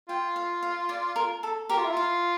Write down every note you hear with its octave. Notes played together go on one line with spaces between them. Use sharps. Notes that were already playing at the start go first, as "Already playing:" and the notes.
F4 G5
F5
F5
D5
A#4
A4
G4 A#4
F4
E4
F4 F5